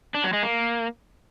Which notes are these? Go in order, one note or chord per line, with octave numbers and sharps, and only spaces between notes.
D4
F#3
G#3
A#3